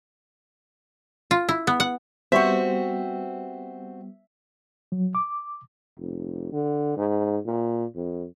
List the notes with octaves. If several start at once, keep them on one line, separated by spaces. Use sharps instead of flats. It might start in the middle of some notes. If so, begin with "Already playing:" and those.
F4
E4
B3
F#5
G3 B3 C4 F#4 C5 E5 C#6
F#3
D6
F1
D3
G#2
A#2
F2